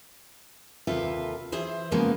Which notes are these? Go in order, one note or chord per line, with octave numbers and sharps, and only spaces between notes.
D#2 C3 F4 A4 B4 E5
E3 G#4 C5 E5
C#3 F3 G#3 A#3 B3